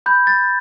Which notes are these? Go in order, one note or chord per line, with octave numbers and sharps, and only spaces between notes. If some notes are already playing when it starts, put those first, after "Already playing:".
B5 G6
A6